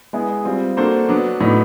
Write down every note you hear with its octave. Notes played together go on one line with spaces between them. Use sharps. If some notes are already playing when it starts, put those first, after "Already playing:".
G#3 B3 E4 G#4
G3 C4 F4
A#3 D4 F#4 A4 C5
F#3 B3 D4
A2 F#3 B3 D#4